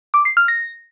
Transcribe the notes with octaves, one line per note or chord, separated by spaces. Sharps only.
D6
C7
F6
A#6